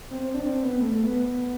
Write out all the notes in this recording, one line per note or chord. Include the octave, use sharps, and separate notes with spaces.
C4
C4
D4
C4
B3
A3
A3
B3